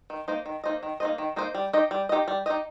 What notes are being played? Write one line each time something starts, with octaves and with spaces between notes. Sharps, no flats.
D#3
A#3 D#4 C5 D#5
D#3
A#3 D#4 C5 D#5
D#3
A#3 D#4 C5 D#5
D#3
A#3 D#4 C5 D#5
G3
D#4 G4 D#5
G3
D#4 G4 D#5
G3
D#4 G4 D#5